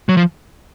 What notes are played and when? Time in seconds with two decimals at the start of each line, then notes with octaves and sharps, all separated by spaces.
0.09 F#3
0.17 F3